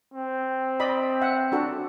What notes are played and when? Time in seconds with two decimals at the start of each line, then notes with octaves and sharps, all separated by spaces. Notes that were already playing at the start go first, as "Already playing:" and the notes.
0.14 C4
0.80 D5 D#5 B5
1.21 E5 F#5
1.52 D4 F#4 A4